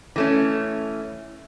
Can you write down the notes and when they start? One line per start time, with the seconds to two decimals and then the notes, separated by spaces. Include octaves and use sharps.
0.16 E3 A3 C#4